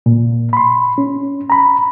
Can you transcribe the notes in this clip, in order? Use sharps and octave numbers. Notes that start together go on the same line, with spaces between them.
A#2
B5 C6
C#4
A#5 B5